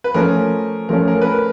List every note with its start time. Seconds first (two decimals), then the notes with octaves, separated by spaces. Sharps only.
0.04 B4
0.14 F3 A3 C#4 A#4
0.89 F3 A3 C#4 A#4
1.08 A#4
1.21 B4
1.27 A#4